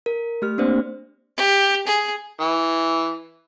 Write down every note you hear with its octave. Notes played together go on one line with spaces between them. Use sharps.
A#4
A3 G4 F6
A#3 C4 D4 C5 D5
G4
G#4
E3